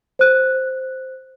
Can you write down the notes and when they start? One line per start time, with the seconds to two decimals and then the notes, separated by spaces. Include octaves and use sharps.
0.19 C5 F#6